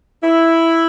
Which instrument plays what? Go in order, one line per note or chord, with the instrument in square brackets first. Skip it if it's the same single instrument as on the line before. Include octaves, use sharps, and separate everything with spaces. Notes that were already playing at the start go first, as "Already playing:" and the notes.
[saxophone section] E4